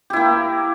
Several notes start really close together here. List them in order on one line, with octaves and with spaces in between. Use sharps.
G4 E4 A#3